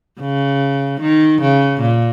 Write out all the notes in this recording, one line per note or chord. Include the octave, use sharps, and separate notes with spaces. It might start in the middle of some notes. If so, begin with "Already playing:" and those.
C#3
D#3
C#3
A#2